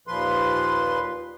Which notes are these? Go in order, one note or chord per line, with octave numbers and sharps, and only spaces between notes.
D#2 A#2 F3 B4 C6